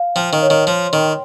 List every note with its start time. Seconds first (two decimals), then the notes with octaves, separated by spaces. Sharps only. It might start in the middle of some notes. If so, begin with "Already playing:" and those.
Already playing: F5
0.16 F3 G5
0.33 D#3
0.42 C#5
0.50 D#3
0.67 F3 C6
0.93 D#3 G5